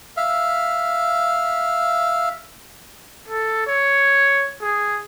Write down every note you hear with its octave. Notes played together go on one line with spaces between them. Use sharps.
E5 F5
A4
C#5
G#4